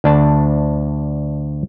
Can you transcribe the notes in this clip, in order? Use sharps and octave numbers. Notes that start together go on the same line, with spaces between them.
D2 D4 A5